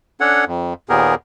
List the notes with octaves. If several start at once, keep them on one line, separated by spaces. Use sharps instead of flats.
C#4 D4 A4 C#5 F#5
F2
D#2 A#2 B3 G4 G#4 A#4